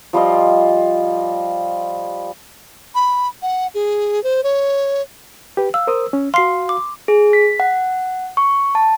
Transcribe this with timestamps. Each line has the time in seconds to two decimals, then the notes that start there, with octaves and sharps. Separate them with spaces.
0.13 F3 G3 F4 D#5
2.95 B5
3.42 F#5
3.74 G#4
4.24 C5
4.43 C#5
5.57 G4 B4
5.74 F5 E6
5.87 A#4 C5 D#6
6.13 C#4
6.34 F#4 F5 C6 C7
6.69 D6
7.08 G#4
7.33 B6
7.60 F#5
8.37 C#6
8.75 A5